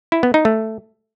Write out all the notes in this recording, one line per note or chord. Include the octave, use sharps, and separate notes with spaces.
E4
B3
D#4
A3